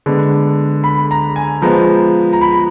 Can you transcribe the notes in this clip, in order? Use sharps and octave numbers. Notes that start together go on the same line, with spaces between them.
D3 G#3 B3
B5
A#5
G#5
F3 G#3 B3 A#5
A#5
B5